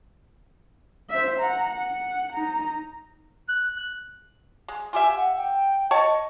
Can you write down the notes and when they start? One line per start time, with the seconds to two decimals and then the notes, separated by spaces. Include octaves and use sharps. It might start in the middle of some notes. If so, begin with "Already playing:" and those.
1.10 C5 E5
1.40 F#5 A#5
1.70 F#5
2.33 D#4 A#5
3.48 F#6
4.68 G#3
4.93 F4 G4 E5 G#5
5.17 F#5
5.37 G5
5.91 C#5 D#5 A5 C#6